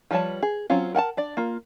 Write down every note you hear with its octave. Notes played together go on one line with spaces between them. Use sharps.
F3 G3 B4 C#5 A5
G#4
F#3 C4 C#4 F4
A#4 F#5 G#5 A5
D4 D5
A#3 F4